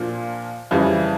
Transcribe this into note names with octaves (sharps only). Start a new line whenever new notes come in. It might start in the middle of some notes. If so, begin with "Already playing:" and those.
Already playing: A#2 F3 A#3 D4 F4
F2 C#3 E3 G3